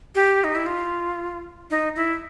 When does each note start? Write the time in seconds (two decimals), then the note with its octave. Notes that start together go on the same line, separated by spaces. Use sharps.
0.15 G4
0.44 D#4
0.55 E4
0.66 F4
1.71 D#4
1.96 E4